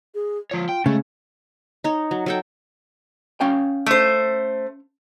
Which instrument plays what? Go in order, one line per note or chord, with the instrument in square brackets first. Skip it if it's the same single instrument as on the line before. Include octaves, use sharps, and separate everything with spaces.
[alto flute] G#4
[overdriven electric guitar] F3 C#5 [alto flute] F4
[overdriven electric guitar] G5
[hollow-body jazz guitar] C#3 [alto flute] G#3 [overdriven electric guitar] A3
[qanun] D#4 C#5
F#3
F#3 A4 G5
[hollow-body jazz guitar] C#4 F5 G5
[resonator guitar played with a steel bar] A3 C5